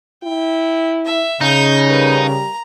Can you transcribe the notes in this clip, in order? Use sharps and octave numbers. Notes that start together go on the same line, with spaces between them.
E4 G5
E5
C#3 D#4 G6 A#6
G3 A#4 B4
A#5